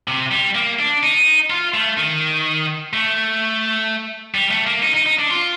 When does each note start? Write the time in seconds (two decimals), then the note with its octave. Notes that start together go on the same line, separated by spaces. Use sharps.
0.08 C3
0.31 G3
0.55 A#3
0.79 D4
1.03 D#4
1.50 F4
1.74 A3
1.98 D#3
2.93 A3
4.35 G3
4.51 A3
4.67 A#3
4.83 D#4
4.95 D#4
5.06 D#4
5.19 D4
5.31 F4